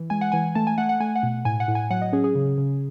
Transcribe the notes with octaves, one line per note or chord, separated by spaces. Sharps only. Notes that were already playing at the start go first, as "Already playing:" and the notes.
Already playing: E3
G#3 G#5
F#5
E3 G#5
A3 A5
G#5
A3 F#5
F#5
A3 G#5
F#5
B2
A2 G#5
F#5
A2
G#5
F#3 F#5
D#5
C#4 G#4
G#4
C#3
C#3